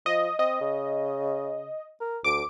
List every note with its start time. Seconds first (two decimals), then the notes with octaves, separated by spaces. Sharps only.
0.06 F3 D#5
0.39 C4 D#5
0.61 C#3
2.01 A#4
2.24 D2 D6 D7